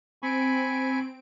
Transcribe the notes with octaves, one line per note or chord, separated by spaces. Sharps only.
C4 G#5 B5 C#6 D7